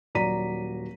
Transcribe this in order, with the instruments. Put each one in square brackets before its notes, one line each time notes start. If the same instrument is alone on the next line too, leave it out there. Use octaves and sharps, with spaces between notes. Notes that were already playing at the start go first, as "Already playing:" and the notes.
[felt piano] D#1 F#3 D5 A#5 B6 D#7